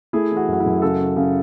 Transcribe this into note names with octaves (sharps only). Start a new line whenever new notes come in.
A3 E4 G#4
E3
F#4
F#2 F#4
E4 G#4
F#2
C#3 F#4 A4
C#3
C#3